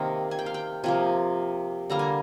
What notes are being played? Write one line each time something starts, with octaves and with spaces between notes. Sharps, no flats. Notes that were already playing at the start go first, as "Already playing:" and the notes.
Already playing: C3 D#3 A#3 D#5
G#5
G5
F5
G5
C3 F3 A#3 G#5
D3 G3 A#3 A#5
G#5